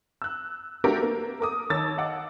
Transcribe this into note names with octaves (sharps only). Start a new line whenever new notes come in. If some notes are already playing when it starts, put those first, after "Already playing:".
E6 F#6
A3 D4 F#4 G4 A4 A#4
A#3
A4 A#4 D6 D#6
D#2 D#3 C#5 D#6 E6 A6
D#5 F5 F#5 D6